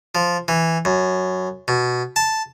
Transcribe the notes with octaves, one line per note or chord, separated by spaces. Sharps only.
F3
E3
F#2
B2
A5